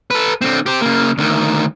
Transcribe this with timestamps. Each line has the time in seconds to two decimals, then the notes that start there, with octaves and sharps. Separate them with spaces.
0.11 A4 B4
0.41 D3 C4
0.66 G4 C5
0.81 C#3 A#3
1.18 D2 D#3